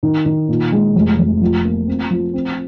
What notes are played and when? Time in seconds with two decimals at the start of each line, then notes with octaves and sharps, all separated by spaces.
0.03 D#3
0.25 D#3
0.49 A#2
0.72 G#3
0.95 F1
1.19 F1
1.41 F3
1.64 A#3
1.87 C4
2.10 F3
2.33 C4